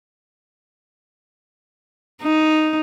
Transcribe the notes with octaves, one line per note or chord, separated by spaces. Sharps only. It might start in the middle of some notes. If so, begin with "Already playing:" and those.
D#4